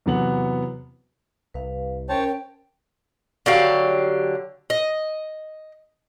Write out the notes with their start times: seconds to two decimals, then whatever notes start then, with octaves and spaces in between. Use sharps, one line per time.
0.06 E2 C3 F#3 B3 F#5 F#7
1.54 C2 B4 F5
2.09 C#4 A#4 C5 C#5 G5 A5
3.46 D3 F#3 G4 F5
4.70 D#5